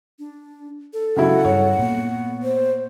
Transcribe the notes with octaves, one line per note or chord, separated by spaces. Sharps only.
D4
A4
C#3 F#3 E4 F#5
G2 C#5
A#2 B3
C5